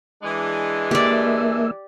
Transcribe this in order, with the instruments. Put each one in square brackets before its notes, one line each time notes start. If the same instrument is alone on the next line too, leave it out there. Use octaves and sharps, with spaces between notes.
[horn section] E3 G#3 D4
[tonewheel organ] A#3 E5 [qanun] G4 D5